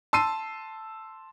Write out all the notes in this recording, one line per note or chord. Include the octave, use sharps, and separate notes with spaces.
A5 C6 E6 C7 D#7